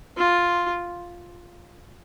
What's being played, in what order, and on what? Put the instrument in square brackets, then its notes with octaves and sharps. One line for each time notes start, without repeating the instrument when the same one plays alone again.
[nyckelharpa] F4